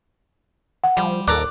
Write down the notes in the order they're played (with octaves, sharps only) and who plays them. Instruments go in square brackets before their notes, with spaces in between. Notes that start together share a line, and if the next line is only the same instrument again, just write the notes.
[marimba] F#5
[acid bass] F3 [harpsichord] G3
[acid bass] D#2 [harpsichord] A4 A#4 D5 [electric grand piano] D6 F#6